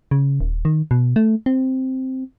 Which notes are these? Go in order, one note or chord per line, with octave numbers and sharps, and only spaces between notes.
C#3
D#1
D#3
B2
A3
C4